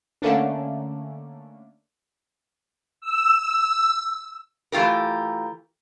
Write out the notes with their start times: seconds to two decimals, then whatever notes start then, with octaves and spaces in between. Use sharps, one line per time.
0.22 D3 A3 A#3 C#4 D4
3.01 E6
4.72 E3 A3 F4 G4 A#4